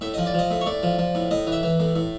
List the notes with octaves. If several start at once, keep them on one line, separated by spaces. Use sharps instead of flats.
A2 E5
F3 D#5
D5
F3 D#5
A2
C#5
A2 D5
F3
F3
A2
A2 D#5
E3
E5
E3
A2
A2